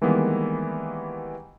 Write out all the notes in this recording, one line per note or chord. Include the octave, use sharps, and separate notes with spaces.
D#3 E3 G3 G#3 A#3 B3